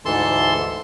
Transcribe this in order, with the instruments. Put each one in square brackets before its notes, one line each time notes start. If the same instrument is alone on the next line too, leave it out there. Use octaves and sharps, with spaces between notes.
[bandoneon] D2 G#2 E3 A4 A5 C6